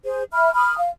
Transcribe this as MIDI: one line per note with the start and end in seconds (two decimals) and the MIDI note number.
0.04 0.22 68
0.04 0.22 72
0.32 0.53 76
0.32 0.53 83
0.32 0.53 89
0.53 0.77 83
0.53 0.77 87
0.53 0.77 89
0.77 0.89 77